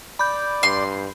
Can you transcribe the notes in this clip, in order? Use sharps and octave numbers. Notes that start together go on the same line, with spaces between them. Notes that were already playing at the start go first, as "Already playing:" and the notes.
D5 B5 G6
G2 C6